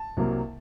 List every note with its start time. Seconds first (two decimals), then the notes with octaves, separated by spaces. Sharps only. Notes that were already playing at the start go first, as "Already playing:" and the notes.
Already playing: A5
0.17 C2 C3 F#3 A#3